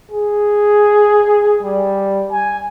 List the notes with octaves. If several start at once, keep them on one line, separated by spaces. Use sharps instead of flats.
G#4
G3
G#5